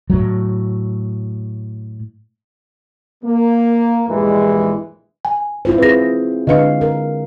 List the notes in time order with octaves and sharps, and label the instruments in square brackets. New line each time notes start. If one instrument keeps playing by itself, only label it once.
[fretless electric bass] A2 F#3
[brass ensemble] A#3
A#1 E2 G2 E3 G#3
[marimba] G#5
[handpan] E4 F4 C5
[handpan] C4 G#4 [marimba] B4 A#6
[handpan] D3 G#3 F5 [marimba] D4 B4 D#5
[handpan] A#4